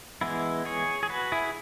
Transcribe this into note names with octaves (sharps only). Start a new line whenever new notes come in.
E3 G#3 B3 E4
G#4 C#5
G#4
F#4 B4
E4 G#4